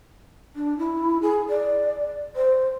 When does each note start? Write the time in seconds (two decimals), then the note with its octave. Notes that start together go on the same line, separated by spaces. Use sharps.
0.56 D4
0.79 E4
1.22 G#4
1.50 D5
2.36 C5